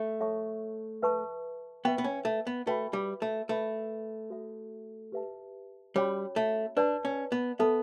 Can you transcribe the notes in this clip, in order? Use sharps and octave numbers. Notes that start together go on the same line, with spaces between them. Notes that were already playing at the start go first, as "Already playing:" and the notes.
Already playing: A3
A4 C#5 E5 A5 C#6
B4 E5 A5 C#6
B3 B4 E5 G5 C#6
B3
C#4
A3
B3
A3 F#4 B4 E5 G5 B5
G3
A3
A3 B4 E5 B5
F#4 A4 E5
G4 B4 E5 A5
G3 C#4 F#4 C#5 G5 B5
A3
D4 B4 D5 A5
C#4
B3
B3 A4 E5 A5